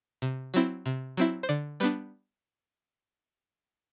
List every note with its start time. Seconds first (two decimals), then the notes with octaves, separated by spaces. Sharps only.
0.22 C3
0.54 F#3 C4 E4
0.86 C3
1.17 F#3 C4 E4
1.43 C5
1.49 D3 D5
1.80 G3 B3 D4 B4